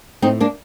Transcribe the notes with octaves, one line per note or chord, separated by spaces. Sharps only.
A2 C4 D#4
A#3 D4